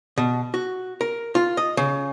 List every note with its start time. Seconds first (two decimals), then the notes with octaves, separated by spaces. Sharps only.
0.18 B2
0.54 F#4
1.01 A#4
1.35 F4
1.57 D#5
1.77 C#3